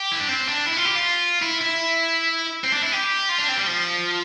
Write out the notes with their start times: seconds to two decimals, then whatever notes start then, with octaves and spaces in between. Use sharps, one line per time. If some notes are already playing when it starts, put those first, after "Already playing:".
Already playing: G4
0.12 E4
0.20 D4
0.29 C4
0.48 D4
0.66 E4
0.77 F4
0.86 G4
0.95 F4
1.41 E4
1.61 E4
2.64 C4
2.73 D4
2.82 E4
2.92 G4
3.29 F4
3.38 D4
3.48 C4
3.57 G3
3.67 F3